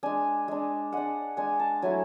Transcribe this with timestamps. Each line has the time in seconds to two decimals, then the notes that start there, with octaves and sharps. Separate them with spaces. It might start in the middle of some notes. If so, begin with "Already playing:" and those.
0.03 G#3 D4 G#5
0.48 G#3 D4
0.92 G#3 D4 F#5
1.37 G#3 D4 G#5
1.60 A5
1.82 F#3 A3 E4 G#5